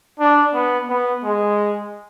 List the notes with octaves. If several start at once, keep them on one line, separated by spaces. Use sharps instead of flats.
D4
B3
B3
G#3